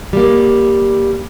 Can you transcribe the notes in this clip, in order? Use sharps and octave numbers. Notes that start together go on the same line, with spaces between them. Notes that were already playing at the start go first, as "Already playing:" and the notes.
G3 A#3